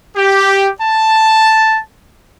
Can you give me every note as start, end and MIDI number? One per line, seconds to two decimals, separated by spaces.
0.16 0.69 67
0.81 1.80 81